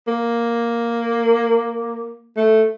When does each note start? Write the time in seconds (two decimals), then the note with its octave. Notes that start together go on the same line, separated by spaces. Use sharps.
0.07 A#3
2.37 A3